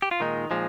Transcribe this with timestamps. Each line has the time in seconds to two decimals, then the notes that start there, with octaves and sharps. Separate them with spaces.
0.02 G4
0.11 F4
0.20 A#2 D#3 G#3 D#4
0.51 A#2 F3 G#3